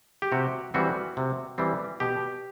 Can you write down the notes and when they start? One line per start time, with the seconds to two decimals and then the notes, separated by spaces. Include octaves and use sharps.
0.22 G4
0.32 C3 F#4
0.74 E3 G3 C4 F#4
1.17 C3
1.58 E3 G3 C4
2.00 B2 G4